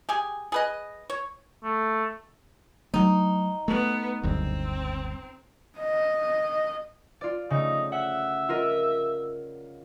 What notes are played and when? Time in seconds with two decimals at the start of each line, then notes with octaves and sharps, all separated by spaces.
0.09 G4 G#4 G#5
0.52 G#4 B4 D#5
1.10 C#5
1.64 A3
2.94 F#3 A3 D#4
3.68 A3 B3
4.23 F#1 D2 G2 C4
5.79 D#5
7.21 F4 D5
7.50 C#3 A3 D#4
7.92 E5 F#5
8.49 F4 A#4 D#5